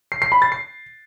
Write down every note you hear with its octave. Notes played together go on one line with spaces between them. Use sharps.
C7
C7
B5
A6
C7